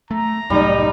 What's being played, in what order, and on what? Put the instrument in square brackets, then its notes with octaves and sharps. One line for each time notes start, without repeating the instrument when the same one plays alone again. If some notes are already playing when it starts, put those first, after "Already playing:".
[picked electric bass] A3 [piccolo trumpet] A#5
[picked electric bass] C2 F#2 A2 [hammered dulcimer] G3 [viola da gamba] D#4